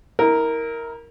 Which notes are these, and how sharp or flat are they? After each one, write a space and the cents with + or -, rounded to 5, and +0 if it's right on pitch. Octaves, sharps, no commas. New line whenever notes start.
E4 -35 A#4 +0